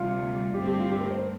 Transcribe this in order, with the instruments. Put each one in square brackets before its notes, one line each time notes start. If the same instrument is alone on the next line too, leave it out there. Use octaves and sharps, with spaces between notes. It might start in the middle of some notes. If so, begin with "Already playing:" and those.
Already playing: [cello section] D2 C3 G3 [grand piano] F4
[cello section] G2 D3 A3 C4 [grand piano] G4
[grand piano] G4
F4
G4
A#4
C5
A#4